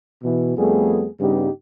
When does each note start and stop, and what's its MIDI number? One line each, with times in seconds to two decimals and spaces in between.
0.23 0.55 47
0.23 0.55 52
0.57 1.07 41
0.57 1.07 55
0.57 1.07 57
0.57 1.07 59
0.57 1.07 68
1.20 1.48 43
1.20 1.48 49
1.20 1.48 55
1.20 1.48 59
1.20 1.48 63
1.20 1.48 67